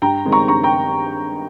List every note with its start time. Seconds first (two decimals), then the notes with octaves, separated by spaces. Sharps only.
0.02 G2 G5 A#5
0.25 D#3 G#3 C4
0.32 A#5 C#6
0.48 G2 A#5 C#6
0.63 G5 A#5